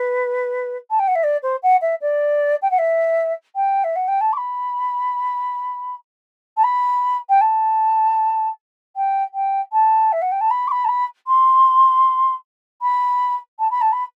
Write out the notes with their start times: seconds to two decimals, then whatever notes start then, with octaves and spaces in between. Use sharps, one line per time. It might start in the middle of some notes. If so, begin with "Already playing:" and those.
Already playing: B4
0.90 A5
0.99 G5
1.08 F#5
1.15 E5
1.23 D5
1.43 C5
1.63 F#5
1.81 E5
2.01 D5
2.62 G5
2.71 F#5
2.78 E5
3.56 G5
3.84 E5
3.96 F#5
4.08 G5
4.21 A5
4.33 D6
4.37 B5
6.57 A5
6.64 B5
7.29 G5
7.41 A5
8.96 G5
9.34 G5
9.72 A5
10.12 E5
10.22 F#5
10.32 G5
10.41 A5
10.51 B5
10.68 D6
10.71 B5
10.85 A5
10.88 B5
11.27 C6
12.82 B5
13.59 A5
13.71 B5
13.81 A5
13.92 B5